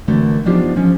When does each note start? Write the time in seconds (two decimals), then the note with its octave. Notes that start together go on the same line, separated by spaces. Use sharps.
0.08 D3 E3 A3 C4 F#4 A#4
0.46 F3 B3 D4 D#4 F4 G4
0.76 F3 C#4